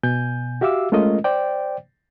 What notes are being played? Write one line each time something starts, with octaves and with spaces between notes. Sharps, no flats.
B2 G#5 G6
F#4 G4 E5 F5 D6 E6
G#3 A3 C#4 F4 A#4 D#5
C5 D5 G5